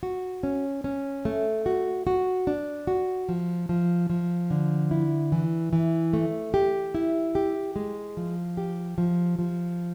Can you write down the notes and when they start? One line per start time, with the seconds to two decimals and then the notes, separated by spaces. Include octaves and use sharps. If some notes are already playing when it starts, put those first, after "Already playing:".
0.03 F#4
0.43 C#4
0.84 C#4
1.25 A3
1.66 F#4
2.07 F#4
2.47 D4
2.87 F#4
3.29 F3
3.69 F3
4.10 F3
4.51 D3
4.91 E4
5.32 E3
5.73 E3
6.13 A3
6.54 G4
6.95 E4
7.35 G4
7.76 G#3
8.17 F3
8.57 G4
8.98 F3
9.39 F3